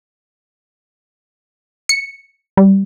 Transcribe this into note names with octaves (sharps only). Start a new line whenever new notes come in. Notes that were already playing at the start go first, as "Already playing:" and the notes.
C#7
G3